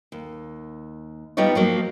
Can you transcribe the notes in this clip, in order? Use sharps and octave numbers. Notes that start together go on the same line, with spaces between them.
D#2
G3 B3 D#4 F4 C#5
F3 F#3 A#3